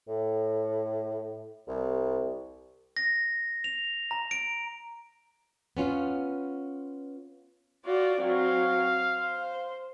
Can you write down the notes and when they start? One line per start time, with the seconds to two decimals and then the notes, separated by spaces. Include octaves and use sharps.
0.08 A2
1.68 C2
2.97 A#6
3.64 F7
4.11 A#5
4.31 D7
5.77 B3 C#4 F4
7.85 F4 F#4 D5
8.20 F#3 C4 F5
9.17 C5